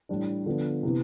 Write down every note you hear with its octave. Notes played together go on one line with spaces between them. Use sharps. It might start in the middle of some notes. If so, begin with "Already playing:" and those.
A2 E3 G3 D4
D3 F3 B3 D4
C3 E3 B3